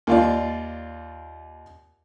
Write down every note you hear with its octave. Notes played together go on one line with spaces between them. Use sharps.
D#2 F4 D5